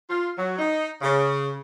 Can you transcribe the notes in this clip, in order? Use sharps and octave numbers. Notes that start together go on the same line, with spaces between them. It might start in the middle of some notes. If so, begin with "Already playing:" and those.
F4
F#3
D#4
C#3